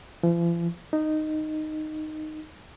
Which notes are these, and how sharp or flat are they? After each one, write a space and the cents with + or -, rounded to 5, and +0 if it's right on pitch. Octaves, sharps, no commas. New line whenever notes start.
F3 -45
D#4 -10